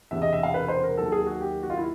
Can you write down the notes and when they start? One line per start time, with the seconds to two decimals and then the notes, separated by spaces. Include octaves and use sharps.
0.11 E1 E2 C3 E5
0.22 D#5
0.33 E5
0.43 F5
0.54 B4
0.68 C5
0.83 A#4
0.97 D#2 D#3 F#3 A4
1.12 G#4
1.26 F#4
1.41 G4
1.63 F#4
1.70 F4
1.77 E4